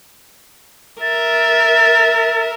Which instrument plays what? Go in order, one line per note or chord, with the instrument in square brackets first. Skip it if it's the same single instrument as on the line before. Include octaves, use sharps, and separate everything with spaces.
[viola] A#4 E5 [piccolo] A6